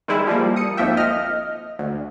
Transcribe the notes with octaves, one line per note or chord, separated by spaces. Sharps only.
D#3 E3 G3 G#3 E4
F3 G3 A#3
D#6 C#7
G#1 F2 F3 A#3 E5 G5
D#5 F6
D2